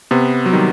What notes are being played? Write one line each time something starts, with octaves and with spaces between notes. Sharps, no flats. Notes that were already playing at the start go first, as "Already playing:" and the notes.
C3 B3
F#3
D#3 G3